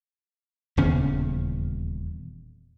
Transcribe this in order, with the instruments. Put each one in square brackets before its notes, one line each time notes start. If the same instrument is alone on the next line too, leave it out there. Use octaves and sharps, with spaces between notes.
[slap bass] D#1 E2 C#3 C#4